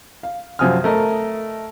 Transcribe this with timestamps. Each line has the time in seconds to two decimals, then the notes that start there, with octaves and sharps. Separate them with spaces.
0.23 F5
0.59 F#2 C3 F3 G#5 D#6 F6
0.84 A3 A#4 D#5